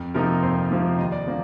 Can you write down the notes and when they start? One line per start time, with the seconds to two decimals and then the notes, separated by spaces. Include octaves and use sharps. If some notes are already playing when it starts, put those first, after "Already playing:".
Already playing: F2
0.14 C3 F3 A#3 D#4 A#4
0.43 F2 C5
0.71 C3 F3 A#3 D#4
0.99 D#2 D#5
1.12 D5
1.27 D3 F3 A#3